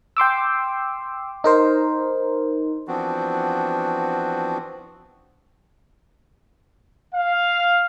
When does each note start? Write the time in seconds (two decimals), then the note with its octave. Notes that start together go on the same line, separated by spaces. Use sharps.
0.17 G5 C6 D6 E6
1.44 D#4 A#4 C5
2.88 E3 F3 B3 C4 D4 F#4
7.14 F5